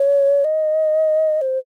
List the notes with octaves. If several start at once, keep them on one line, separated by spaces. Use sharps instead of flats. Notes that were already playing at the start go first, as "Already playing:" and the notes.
Already playing: C#5
D#5
C5